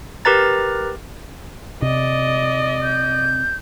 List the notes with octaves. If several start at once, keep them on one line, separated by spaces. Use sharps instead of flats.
G4 A#4 B4 A#5 A6
C3 D5 D#5
G6